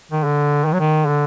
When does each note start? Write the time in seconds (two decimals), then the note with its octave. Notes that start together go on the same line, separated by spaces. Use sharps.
0.11 D#3
0.24 D3
0.65 D#3
0.73 F#3
0.80 D#3
1.07 D3